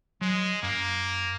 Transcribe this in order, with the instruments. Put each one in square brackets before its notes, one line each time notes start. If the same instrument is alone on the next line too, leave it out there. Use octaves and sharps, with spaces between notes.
[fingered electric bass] F#3 [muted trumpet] G#3
[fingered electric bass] F#2 [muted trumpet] A#3